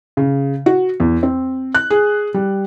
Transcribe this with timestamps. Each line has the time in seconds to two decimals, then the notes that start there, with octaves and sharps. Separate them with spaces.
0.17 C#3
0.66 F#4
1.00 E2
1.23 C4
1.75 F#6
1.90 G#4
2.34 G3